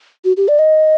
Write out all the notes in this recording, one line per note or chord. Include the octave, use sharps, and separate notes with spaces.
F#4
G4
D5
D#5